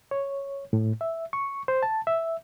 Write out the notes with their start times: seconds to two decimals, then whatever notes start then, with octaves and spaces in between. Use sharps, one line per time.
0.11 C#5
0.73 A2
1.01 E5
1.33 C#6
1.68 C5
1.83 A5
2.07 E5